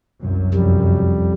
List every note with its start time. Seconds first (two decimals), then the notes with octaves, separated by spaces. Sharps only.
0.22 C2 F#2
0.54 F2 G3